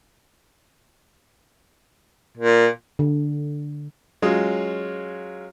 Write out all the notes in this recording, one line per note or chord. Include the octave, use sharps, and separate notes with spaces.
A#2
D3
F#3 G#3 C#4 F4